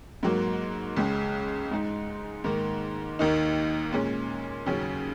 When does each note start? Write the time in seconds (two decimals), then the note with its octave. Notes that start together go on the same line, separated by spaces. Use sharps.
0.23 G#2 F#3 A#3
0.97 C#2 C#3 G#3
1.71 G#2 G#3 D#4
2.44 G#2 D#3 A#3
3.19 D#2 D#3 A#3 D#4
3.92 A#2 G#3 C#4
4.66 D#2 C#3 F#3 C#4